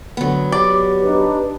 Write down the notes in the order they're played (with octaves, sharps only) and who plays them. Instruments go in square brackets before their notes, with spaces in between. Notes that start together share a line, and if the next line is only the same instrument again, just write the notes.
[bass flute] D3 [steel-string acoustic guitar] F#3 B3
[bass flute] G4 [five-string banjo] D5
[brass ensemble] D4 D#4 B4